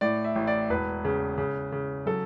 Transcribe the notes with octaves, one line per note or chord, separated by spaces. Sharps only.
A2 D5
E5
A1
D5
E1 B4
C#3
C#3
C#3
F#3 A4